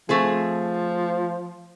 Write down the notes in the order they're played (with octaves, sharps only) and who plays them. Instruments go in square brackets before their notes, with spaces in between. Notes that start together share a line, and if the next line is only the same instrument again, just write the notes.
[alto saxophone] F3 [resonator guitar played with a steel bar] A3 C4 G#4